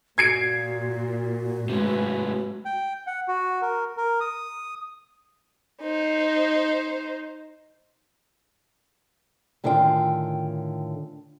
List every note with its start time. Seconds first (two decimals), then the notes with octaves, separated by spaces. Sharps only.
0.18 A#2 F#4 G#6 C7 D7
1.69 G#2 C3 G#3 A3 B4
2.65 G5
3.07 F#5
3.28 F#4
3.62 A#4
3.97 A#4
4.21 D#6
5.82 D#4 C5
9.64 A2 D3 D#3 C#4 F4 G5